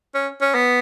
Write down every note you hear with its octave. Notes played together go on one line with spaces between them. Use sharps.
C#4
C#4
B3